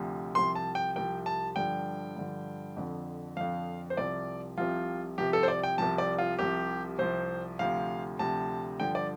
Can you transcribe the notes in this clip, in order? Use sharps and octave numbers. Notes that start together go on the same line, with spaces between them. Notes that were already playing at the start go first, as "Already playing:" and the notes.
Already playing: D2 C3 F3
C2 C3 F3 C6
A5
G5
C2 C3 F3 G5
A5
G2 D3 F3 G5
G2 D3 F3
F2 D3 F3
F2 D3 F3 F5
C5
C2 C3 F3 D5
C2 C3 F3 F4
C2 C3 F3 G4
A4
C5
D5
G5
C2 C3 F3 A5
D5
F4
C2 C3 F3 G4
C2 C3 F3 C5
D2 C3 F3 F5
D2 C3 F3 A5
G2 D3 F3 G5
D5